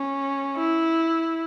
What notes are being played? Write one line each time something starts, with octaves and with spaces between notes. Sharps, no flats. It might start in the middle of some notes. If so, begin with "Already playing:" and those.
Already playing: C#4
E4